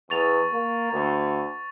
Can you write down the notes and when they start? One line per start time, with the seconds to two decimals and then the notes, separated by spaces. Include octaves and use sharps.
0.10 E2 C#6 A6 F7
0.53 A#3
0.93 D2